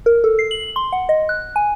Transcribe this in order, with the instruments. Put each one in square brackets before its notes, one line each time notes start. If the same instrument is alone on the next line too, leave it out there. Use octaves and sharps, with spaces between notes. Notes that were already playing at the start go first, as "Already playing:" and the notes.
[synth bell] A#4
A4
C7
F#7
C6
F#5
D#5
F#6
G#5